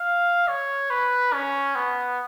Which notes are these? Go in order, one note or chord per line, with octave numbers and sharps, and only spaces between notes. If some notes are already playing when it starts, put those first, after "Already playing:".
Already playing: F5
C#5
B4
C#4
B3